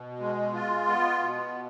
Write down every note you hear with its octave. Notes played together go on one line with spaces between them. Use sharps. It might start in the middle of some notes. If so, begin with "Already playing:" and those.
Already playing: B2
G#3
F4
B3
B2